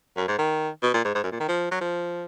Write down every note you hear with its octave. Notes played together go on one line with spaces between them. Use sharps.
F#2
G#2
D#3
B2
A#2
G#2
G#2
F#2
A#2
D#3
F3
F#3
F3